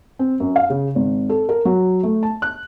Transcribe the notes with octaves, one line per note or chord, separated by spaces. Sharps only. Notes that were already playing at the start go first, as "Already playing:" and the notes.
C4
F#2
F5
C#3
G#1
A4
A#4
F#3
A3
A5
F#6